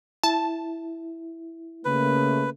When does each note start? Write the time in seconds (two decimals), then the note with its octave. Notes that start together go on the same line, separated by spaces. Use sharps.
0.24 E4 A5
1.85 C#3 A3 A#3 B4